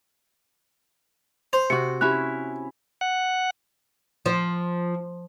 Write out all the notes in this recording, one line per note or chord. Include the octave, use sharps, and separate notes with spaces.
C5 F7
C3 F#4 C#7
C#4 E4 G4 F#6
F#5
F3